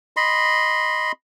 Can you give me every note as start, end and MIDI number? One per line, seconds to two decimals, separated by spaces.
0.17 1.12 75
0.17 1.12 83
0.17 1.12 84